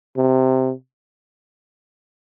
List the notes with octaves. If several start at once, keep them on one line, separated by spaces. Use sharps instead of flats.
C3